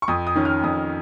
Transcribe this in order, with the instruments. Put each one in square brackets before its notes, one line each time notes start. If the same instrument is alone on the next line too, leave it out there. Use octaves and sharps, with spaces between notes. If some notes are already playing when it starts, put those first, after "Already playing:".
[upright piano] C#6
F2 D#6
D#6
D#3 C#4
F6
F2 D#6